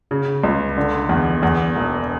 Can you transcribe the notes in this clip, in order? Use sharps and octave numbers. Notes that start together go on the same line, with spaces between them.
C#3
C#2
D3
E2
E2
E1